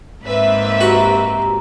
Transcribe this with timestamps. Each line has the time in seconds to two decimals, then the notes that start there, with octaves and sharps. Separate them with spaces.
0.24 G#2 A#3 C4 B4 E5
0.81 F#4 G4 A#5